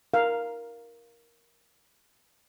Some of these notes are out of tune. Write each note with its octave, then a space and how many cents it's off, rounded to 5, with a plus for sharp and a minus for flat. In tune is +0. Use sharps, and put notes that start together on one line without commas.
A#4 +10 F5 +0